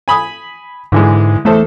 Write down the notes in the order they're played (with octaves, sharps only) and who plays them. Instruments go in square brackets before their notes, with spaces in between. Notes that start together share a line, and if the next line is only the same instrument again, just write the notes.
[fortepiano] G#5 B5 D#6
[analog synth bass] G#2 [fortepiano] D3 E3 G#3
[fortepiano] E2 A4 C5 [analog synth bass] A3